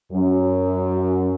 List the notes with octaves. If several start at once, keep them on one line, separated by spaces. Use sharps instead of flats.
F#2